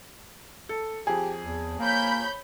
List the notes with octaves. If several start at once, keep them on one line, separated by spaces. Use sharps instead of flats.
A4
F2 G4 G#4
E2
A#3 C#5 B5 G6